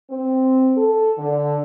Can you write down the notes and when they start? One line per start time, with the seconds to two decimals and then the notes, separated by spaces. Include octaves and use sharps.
0.11 C4
0.77 A4
1.18 D3